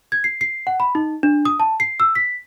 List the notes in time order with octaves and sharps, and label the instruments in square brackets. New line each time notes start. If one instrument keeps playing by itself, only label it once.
[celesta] G#6
C7
C7
F#5
B5
D#4
D4
D#6
A5
C7
E6
B6